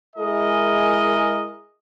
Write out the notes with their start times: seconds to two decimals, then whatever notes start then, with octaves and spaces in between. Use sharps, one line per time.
0.16 G#3 E4 G#4 A#4 D#5